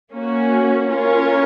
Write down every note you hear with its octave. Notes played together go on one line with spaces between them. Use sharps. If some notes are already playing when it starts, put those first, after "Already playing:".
A#3 C#4 F#4
C#4 F4 A#4 C#5